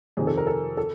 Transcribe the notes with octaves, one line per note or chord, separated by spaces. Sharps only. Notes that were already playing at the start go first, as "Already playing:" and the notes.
F2 C3 D#3 G#4
A4
A#4
A4
A4